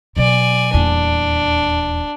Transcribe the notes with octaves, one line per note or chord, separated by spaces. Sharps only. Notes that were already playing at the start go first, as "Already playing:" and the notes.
B2 F#3 D5 G#5
D#1 E2 D4